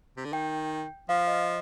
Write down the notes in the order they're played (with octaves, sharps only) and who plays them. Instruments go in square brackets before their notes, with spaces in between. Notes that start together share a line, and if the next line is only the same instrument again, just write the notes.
[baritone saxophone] C3
D3
[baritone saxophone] D#3 [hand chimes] G5
[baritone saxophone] F3 [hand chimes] F5
[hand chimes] D#5